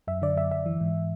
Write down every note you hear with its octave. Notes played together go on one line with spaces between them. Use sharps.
F#2 E5
D3 D5
F#2 E5
F#2 E5
E3
G#2